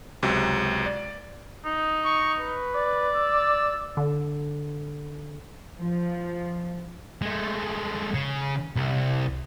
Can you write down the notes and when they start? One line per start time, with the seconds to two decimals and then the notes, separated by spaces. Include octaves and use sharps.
0.23 C#2 C3 F#3
0.86 D5
1.65 D#4
2.05 C#6
2.39 B4
2.75 D5
3.16 E6
3.97 D3
5.80 F3
7.22 G#3 A3
8.14 C#3
8.76 C2